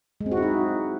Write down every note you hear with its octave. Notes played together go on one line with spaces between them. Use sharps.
G#3
C4
F#4
E4
D#4